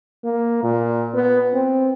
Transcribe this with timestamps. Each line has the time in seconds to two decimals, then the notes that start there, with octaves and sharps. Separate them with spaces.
0.24 A#3
0.63 A#2
1.14 B3
1.53 C4